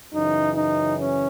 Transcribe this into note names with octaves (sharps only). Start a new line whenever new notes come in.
F#2 C#3 E3 D#4
D#4
C#4